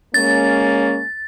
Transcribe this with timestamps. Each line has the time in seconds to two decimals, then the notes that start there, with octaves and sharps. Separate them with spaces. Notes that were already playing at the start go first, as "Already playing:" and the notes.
0.14 G#3 A#3 C#4 A6